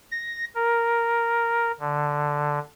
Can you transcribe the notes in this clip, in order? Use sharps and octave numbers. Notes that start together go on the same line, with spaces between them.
A#6
A#4
D3